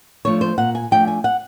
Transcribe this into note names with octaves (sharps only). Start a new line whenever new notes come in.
F3 A3 D4 C#5
C5
A#2 F#5
G#5
F3 A3 D4 G5
G#5
F#5